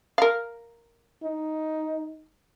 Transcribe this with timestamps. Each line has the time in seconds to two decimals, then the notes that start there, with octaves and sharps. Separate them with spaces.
0.18 A#4 F5
1.23 D#4